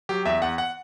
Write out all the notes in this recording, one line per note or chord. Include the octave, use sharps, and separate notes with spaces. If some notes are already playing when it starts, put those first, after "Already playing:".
F#3 G4
E2 E5
E2 F#5
F#5